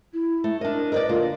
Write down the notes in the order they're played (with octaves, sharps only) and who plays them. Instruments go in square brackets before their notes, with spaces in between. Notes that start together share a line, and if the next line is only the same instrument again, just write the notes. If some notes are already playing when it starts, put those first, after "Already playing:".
[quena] E4
[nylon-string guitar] A3
[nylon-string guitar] D4 D#5 [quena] A#4
[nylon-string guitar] A#4 B4 D5 [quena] D#5
[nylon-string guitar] D3 A#3 [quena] F4